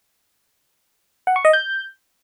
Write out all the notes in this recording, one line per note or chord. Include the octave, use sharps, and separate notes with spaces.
F#5
C#6
D#5
G6